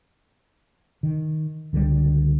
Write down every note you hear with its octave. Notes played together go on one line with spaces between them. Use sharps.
D#3
C#2 D3 D#3 G3